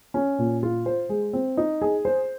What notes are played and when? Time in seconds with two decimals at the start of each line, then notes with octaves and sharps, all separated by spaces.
0.14 C#4
0.39 A#2
0.63 F4
0.86 C5
1.09 G#3
1.33 C4
1.57 D#4
1.82 G#4
2.05 C5